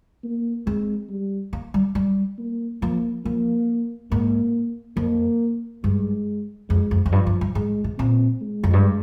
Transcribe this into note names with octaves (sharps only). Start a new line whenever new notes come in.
A#3
G#3 C4
G3
A#3
G3
G3
A#3
F3 A#3
F3 A#3
G#2 A#3
F2 A#3
G2 G#3
F2 G#3
F2
F2
G2 F3
G2
G2
G#2 G#3
C3
A#2 C4
G#3
F2
G2